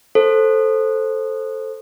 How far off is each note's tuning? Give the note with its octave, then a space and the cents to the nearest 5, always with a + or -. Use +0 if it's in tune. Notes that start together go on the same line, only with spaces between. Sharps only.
A4 +0 C5 +10